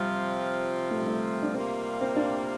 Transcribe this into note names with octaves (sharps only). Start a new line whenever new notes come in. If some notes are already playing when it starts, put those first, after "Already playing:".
Already playing: C3 F3 G3 C4 F4
A3
G3
A3
D4
C3 G3 A#3 C4 F4
C4
D4